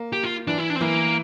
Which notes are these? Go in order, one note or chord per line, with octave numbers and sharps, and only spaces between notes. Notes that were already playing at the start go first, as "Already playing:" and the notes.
Already playing: A#3
G4
F4
E3 D4
E4
D4
C4
E3 A#3